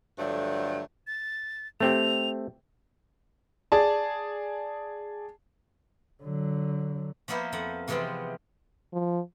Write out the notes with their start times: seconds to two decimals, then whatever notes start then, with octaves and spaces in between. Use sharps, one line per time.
0.19 G2 D3 F3 F#3 A3
1.07 A6
1.80 A3 C4 G4 F7
3.72 G#4 D5 A5
6.23 D3 F#3
7.28 F3 A#3 B3 E4 C5
7.52 F2 F3 F#5
7.88 C3 E3 F3 G#3 B3 C4
8.93 F3